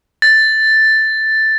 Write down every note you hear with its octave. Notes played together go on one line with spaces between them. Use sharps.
A6